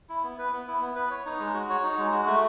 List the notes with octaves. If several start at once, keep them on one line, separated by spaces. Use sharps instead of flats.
E4
B3
B4
B3
E4
B3
B4
C#5
D#4
G#3
F#4
C#5
D#4
G#3
F#4
A3